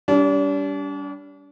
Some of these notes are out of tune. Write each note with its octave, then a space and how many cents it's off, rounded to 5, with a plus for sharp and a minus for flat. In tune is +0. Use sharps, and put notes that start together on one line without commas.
G3 +0 D4 -40